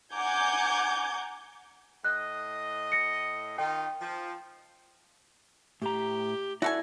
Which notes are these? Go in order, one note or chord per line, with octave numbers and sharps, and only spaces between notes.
F#5 G#5 A#5 D6 G6 G#6
A2 D#5 F#6
A#6 C#7
D#3 D#4 F4 G5
F3
A2 G4 A#5
E4 F#4 A4 D5 G#5